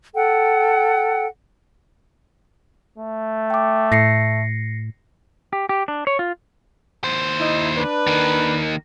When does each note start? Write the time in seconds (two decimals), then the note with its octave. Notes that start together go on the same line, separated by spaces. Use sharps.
0.15 A4 F#5 G5
2.98 A3
3.50 G5 D6
3.92 A2 A#6 C7 C#7
5.53 G4
5.69 G4
5.88 D4
6.07 C#5
6.19 F4
7.04 D#2 C5
7.40 D#4 E4
7.77 D4 B4
8.07 D#3 A#3